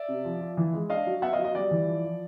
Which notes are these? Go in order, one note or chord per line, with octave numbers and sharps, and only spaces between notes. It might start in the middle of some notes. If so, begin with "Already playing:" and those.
Already playing: D5 E5
C3
F3
F3
E3
G#3
D4 D#5 F5
F#3
B3 E5 F#5
D#5 F5
F#3
D#5
G3 D5
E3
F3
F3